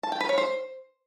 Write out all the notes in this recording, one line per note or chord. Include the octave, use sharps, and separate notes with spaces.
A5
G5
B4
C#5
C5